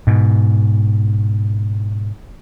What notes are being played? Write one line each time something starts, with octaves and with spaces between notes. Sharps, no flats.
G#2 B2